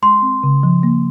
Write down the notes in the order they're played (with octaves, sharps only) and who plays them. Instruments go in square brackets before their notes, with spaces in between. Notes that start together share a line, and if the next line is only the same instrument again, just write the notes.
[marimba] G#3 [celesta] C6
[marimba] C4
C#3
F3
A#3